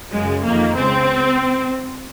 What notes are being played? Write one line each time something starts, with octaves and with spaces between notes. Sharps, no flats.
F#2 C#3 G#3
F2 D#3 A#3
C#2 C#3 C4